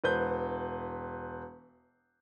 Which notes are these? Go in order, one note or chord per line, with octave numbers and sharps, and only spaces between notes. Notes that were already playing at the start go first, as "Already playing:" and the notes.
E1 B4 C5 G6